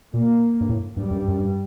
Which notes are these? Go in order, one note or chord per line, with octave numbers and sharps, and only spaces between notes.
A#2 A#3
G2
A2
G2 G3
F#2
G2
F#2
G2